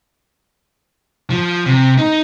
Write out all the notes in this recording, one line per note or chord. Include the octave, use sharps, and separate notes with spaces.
F3
C3
D#4